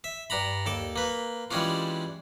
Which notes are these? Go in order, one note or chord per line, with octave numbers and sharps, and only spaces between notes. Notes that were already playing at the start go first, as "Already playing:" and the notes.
E5
G2 D4 A#5 B5
D#2 A4 D6
A#3 B4
E3 G3 G#3 C#4 D4 F4